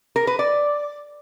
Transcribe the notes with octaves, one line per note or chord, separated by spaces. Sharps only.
A#4
B4
D5